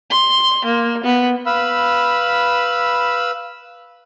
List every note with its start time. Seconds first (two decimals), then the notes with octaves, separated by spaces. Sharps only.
0.11 C6
0.65 A#3
1.04 B3
1.46 B4 F5 B5 E6